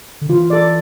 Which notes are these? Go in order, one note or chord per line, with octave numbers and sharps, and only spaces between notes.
D3
E3 F4
A4 D5